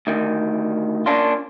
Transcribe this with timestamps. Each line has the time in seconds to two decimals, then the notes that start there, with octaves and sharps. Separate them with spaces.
0.07 D2 D#3
1.06 A#3 C#4 D4 F4